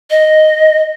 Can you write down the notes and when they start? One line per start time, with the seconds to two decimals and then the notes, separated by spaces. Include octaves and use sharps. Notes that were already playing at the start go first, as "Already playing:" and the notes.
0.11 D#5